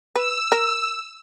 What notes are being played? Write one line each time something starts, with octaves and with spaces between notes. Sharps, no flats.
B4 E6
A#4